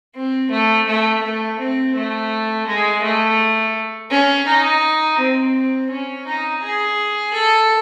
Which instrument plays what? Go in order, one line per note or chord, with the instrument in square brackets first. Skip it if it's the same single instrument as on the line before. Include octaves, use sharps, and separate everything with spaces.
[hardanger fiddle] C4
A3
A3
A3
C4
A3
G#3
A3
C#4
D#4
C4
C#4
D#4
G#4
A4